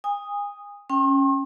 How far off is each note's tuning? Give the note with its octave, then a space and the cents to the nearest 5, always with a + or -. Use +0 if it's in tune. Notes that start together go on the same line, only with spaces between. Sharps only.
G#5 -35 D#6 +0
C#4 -10 G5 +0 C6 +45